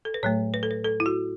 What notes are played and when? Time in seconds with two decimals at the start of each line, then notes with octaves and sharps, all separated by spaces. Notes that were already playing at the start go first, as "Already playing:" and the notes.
0.05 A4
0.14 B4
0.23 A2 F#3 A3 C#5
0.54 B4
0.63 A4
0.71 B4
0.85 A4
1.00 E4
1.06 F#4